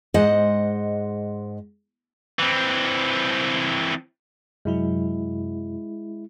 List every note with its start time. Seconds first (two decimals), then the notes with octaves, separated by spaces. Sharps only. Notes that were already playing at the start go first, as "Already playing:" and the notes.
0.14 G#2 G#3 C5 D#5 F#5
2.39 E3 C4
4.65 F#2 C3 F#3 G#3 E4